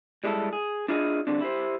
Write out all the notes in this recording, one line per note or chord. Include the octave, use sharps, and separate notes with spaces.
G3 G#3 E4 G4 A4
G#4
D4 E4 F4 G#4 D5 D#5
D3 G3 C4 D4
E4 G4 C5